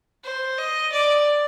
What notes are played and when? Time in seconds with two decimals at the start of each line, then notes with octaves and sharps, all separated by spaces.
0.24 C5
0.58 D#5
0.92 D5